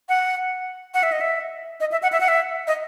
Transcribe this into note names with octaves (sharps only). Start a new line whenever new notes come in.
F#5
F#5
E5
D#5
E5
D#5
E5
F#5
E5
F#5
E5
D#5